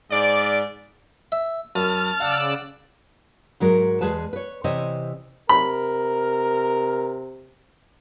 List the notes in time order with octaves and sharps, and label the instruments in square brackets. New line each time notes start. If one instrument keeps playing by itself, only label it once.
[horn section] G#2 D5
[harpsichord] E5
[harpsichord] F#2 [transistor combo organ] A5 F6
[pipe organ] C#3 D5 E6 [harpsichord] F5 F#5
[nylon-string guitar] G#2 F#3 G#3 A#4
E2 G#3 G#4 B4 A5
B4 C#5
C3 E3 C5 C#5 D#5
[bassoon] C3 [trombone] A#4 [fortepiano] B5